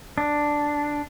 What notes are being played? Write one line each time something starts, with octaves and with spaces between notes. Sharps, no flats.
D4